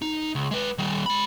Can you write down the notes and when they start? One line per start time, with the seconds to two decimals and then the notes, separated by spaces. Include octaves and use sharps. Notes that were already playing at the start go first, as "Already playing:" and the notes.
0.02 D#4
0.35 C#2
0.51 G#3 B4
0.78 D#3 G3
1.06 G#3 B5